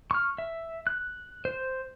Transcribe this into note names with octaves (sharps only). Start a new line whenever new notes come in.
C#6 F6
E5
F#6
C5